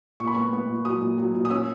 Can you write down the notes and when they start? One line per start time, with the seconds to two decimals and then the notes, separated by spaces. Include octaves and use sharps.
0.20 A#2 C#6
0.27 B5
0.34 B3 C#6
0.53 B3
0.69 A#2
0.85 F#3 D#6
1.02 A#2
1.18 F#3
1.34 A#2
1.45 D#6
1.51 C#4 E6